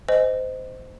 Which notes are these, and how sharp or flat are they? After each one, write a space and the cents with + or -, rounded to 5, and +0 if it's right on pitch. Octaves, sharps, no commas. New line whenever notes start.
C5 -20 D#5 +0